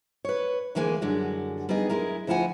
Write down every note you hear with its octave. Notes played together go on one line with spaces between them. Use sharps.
B4 C#5
D2 E3 G#3 A#3 G#5
F#2 D3 G3 G#3 F#4
G3 B3 D#4 G#4 D#5
F#2 G#3 E4 A#4
D2 F3 E4 F4 F#5 G#5